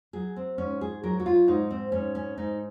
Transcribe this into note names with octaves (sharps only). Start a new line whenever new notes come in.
F#3 G#4
C4
G#2 C#4
G#4
F#3 A#4
F#4
F4
G#2 D#4
C4
G#2 C#4
C#4
G#2 D#4